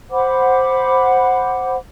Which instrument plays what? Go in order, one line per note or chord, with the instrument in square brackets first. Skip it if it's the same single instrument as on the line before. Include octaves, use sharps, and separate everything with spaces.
[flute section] C5 F#5 B5 D6